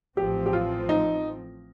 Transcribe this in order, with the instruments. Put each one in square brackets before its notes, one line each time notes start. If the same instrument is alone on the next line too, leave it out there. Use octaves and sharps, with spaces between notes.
[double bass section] A1 A2 F3 C4 [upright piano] G4
[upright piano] G4
F4
D#4